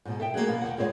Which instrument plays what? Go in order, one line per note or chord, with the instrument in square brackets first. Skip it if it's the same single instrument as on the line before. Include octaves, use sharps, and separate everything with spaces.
[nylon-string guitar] G#2 B2
A4 E5 G5
A3 A#3 D#4 F#4 G#4
B2 A#3 B3
D#2 F#5
G2 G#3 C4 C5 C#5 F#5